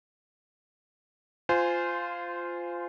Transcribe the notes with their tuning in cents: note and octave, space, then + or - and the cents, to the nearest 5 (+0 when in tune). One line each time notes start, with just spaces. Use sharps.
F4 +0 C5 -20 G#5 +0